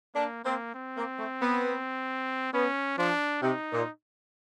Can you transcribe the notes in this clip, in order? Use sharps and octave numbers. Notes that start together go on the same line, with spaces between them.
A#3 D4
A#3 C4
C4
A#3
A3
B3
B3 C#4
F3 D4
C3 D#4
A#2